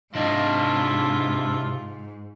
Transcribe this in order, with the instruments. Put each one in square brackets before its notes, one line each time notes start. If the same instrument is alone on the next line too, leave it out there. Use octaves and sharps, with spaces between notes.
[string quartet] G#2 [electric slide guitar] C3 D#5 A5 [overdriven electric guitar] D4 E4 [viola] F4